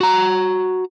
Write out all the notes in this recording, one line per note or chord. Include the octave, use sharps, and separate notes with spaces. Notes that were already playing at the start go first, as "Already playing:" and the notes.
F#4 A#5